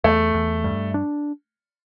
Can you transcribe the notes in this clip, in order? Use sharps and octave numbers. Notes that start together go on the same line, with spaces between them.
E2 A3
E2
G2
D4